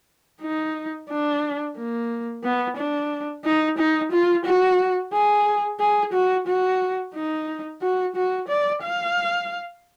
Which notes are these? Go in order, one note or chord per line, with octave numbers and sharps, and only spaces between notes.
D#4
D4
A#3
B3
D4
D#4
D#4
F4
F#4
G#4
G#4
F#4
F#4
D#4
F#4
F#4
D5
F5